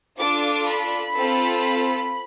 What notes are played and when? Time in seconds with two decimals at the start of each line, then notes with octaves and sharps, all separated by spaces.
0.18 D4 F4 A4 D6
0.67 B5
1.17 C4 F4 A4